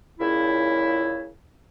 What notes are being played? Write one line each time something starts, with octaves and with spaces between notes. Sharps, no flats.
C#2 A#2 C#3 E4